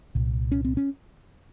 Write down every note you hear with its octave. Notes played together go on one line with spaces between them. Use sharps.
C2 A#2
C#4
C4
C#4